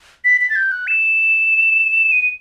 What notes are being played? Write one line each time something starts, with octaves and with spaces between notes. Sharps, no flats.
B6
B6
A6
G6
F#6
E7
D#7